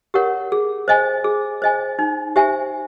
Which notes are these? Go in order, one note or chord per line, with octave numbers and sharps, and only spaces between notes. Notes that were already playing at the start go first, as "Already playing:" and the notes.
G4 A#4 C#5 F#5
G#4
C5 D#5 G#5
G#4
C5 D#5 G#5
D#4
G4 C5 E5 G#5